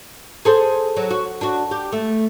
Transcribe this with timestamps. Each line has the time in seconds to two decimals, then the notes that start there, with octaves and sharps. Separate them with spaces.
0.45 G#4 A4 C5
0.96 F#3
1.11 F#4
1.41 D4 F#4
1.71 G4
1.92 A3